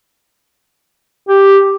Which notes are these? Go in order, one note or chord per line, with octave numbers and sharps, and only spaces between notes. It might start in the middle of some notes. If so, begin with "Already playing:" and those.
G4